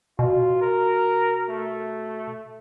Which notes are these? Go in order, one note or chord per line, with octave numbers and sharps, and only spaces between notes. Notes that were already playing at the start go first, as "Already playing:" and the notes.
B2 F4
A#4
A3